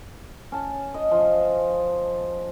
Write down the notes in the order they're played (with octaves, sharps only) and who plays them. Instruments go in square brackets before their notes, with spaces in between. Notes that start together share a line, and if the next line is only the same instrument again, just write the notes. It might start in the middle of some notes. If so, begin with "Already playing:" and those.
[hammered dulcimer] C#4 A5
D#5
F3